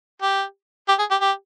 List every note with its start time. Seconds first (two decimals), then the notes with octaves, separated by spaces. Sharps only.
0.22 G4
0.89 G4
0.99 G#4
1.11 G4
1.21 G4